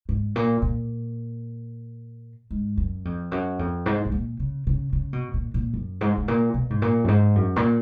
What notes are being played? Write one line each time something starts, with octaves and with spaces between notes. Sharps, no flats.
G#2
A#2
A#2
G#2
F#2
F2
F#2
F2
G#2
G#2
A#2
C#3
C#3
C#3
B2
A#2
A#2
F#2
G#2
G#2
A#2
B2
G#2
A#2
F#2
G#2
F#2
A#2